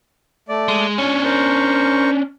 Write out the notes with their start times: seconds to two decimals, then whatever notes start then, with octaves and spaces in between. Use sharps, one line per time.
0.49 A3 D5
0.68 G#3
0.98 C#4 D4 G#5 C#6
1.24 A#4 C5 C#6